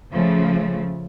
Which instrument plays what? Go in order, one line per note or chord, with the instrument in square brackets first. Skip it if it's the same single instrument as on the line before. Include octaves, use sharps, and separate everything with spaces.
[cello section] C#3 F3 A3